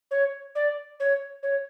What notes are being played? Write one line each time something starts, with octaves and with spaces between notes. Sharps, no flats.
C#5
D5
C#5
C#5